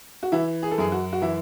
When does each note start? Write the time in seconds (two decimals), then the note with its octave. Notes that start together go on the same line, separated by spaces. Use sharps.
0.23 F#4
0.32 E3 E4
0.63 G#4
0.71 A4
0.78 F#2 G#4
0.92 F#4
1.13 F#4
1.22 E3 E4